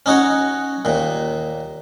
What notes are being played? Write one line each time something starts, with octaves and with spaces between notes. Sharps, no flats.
C#4 D#4 F#4 C#5
D#2 A#2